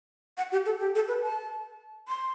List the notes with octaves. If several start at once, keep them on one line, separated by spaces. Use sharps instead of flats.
F#5
G4
A4
G4
A4
B4
A5
C6